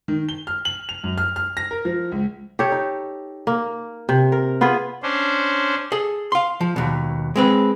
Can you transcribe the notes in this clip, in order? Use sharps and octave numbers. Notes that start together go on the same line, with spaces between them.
D#3
G7
F6
F#7
F7
F#2
F6
F6
A#6
A#4
F3
C#2
G4 A4 C#5
D#4
A#3
C3
A#4
B3 F4 G#4 B4
C#4 D4 C5
G#4 A4
F5 C6
F3
D#2 B2
G#3 C4 B4